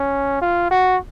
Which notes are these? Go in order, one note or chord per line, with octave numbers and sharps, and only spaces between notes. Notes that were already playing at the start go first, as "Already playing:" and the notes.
Already playing: C#4
F4
F#4